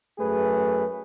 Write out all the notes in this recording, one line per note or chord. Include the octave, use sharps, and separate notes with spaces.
F#2 A3 G#4 B4